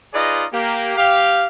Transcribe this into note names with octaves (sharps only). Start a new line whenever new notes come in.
D#4 F4 G#4 B4 D5 D#5
A#3 G4
G4 F5